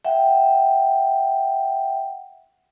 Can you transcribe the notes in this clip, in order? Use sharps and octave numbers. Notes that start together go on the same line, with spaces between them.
E5 F#5 G5